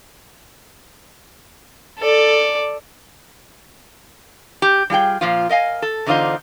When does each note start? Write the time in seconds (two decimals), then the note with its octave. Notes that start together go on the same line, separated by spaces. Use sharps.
1.99 A4 D5
4.62 G4
4.90 G3 F4 G#4 G5
5.21 A#2 F3 F4
5.49 A#4 D#5 F5 G#5
5.82 A4
6.06 E2 D3 D#4 F4 C5 D#5